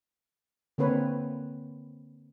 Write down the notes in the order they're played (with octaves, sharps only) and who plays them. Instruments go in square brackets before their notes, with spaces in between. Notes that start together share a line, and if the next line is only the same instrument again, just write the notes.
[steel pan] D3 A#3 C4 B4 C#5